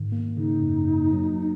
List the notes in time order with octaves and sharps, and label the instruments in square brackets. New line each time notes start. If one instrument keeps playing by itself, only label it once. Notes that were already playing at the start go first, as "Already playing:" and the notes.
Already playing: [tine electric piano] G#2 D#3
A#3
[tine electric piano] C#3 [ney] D#4
[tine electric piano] F#2
A#3
F#3